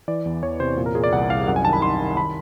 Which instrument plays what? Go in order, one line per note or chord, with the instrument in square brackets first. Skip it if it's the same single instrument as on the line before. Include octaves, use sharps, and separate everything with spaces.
[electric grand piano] E3 D5
E2
E2 C#5
C3 C5
A#2
A#4
A#2 G#4
D5
C2 F#5
C2 F5
F#2 F#5
G#5
D#3 A5
B5
D#3 C6
D#3
D#3 B5